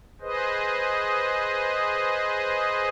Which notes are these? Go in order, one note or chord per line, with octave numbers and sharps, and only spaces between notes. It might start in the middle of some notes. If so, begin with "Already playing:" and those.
G#4 B4 C5 D#5